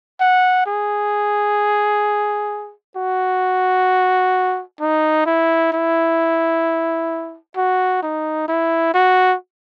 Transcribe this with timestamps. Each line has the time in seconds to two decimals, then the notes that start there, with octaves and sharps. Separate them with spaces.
0.20 F#5
0.66 G#4
2.96 F#4
4.80 D#4
5.26 E4
5.72 E4
7.56 F#4
8.03 D#4
8.48 E4
8.94 F#4